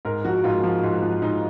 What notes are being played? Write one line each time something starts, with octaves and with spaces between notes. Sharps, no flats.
G#2 A#4
F3 F#4
G#2 F4
F3
G#2
F3
G#2 D#4